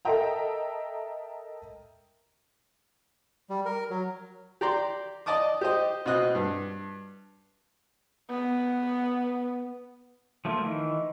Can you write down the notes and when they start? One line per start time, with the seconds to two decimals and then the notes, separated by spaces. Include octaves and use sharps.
0.05 A4 A#4 D#5 E5 G5 A#5
3.50 G3
3.66 A#4
3.90 F#3
4.61 G4 D5 A#5 C6
5.26 D5 D#5 A5 D6 D#6
5.61 G4 C5 D#5
6.06 B2 C4 D#5 F#6
6.35 G2
8.30 B3
10.45 F3 A3 A#3
10.64 D#3 E3